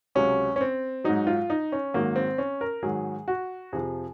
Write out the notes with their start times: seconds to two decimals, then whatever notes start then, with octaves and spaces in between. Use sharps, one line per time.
0.15 C#2 C3 F#3 C#4
0.56 C#4
0.61 C4
1.04 G#2 F#3 D#4
1.27 F4
1.50 D#4
1.72 C#4
1.94 G#2 D#3 F#3 A#3
2.16 C4
2.38 C#4
2.61 A#4
2.83 G#2 D#3 F#3 G#4
3.28 F#4
3.72 F2 C3 F3 G#4